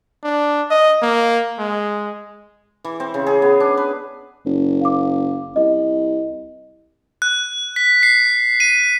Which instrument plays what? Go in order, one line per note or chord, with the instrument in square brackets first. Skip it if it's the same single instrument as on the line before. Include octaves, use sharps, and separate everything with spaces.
[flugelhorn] D4
D#5
A#3
G#3
[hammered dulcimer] E3
C4
C#3
G#4
B3
D4
B4
[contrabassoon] F#1
[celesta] F5 D6
[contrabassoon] C2 [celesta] D#5
[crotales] F#6
B6
C7
D#7